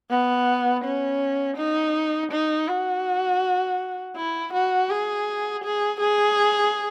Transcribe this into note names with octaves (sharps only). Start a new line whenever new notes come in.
B3
C#4
D#4
D#4
F#4
E4
F#4
G#4
G#4
G#4